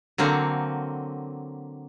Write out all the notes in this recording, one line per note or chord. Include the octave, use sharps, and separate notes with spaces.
D3 F#3 A#3 C4